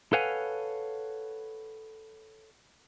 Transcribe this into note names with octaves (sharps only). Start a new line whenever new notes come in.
A4 B4 C#5 F5 F#5 G#5